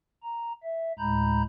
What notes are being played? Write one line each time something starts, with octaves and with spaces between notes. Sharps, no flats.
A#5
E5
D2 A2 G#3 A#5 B5 G6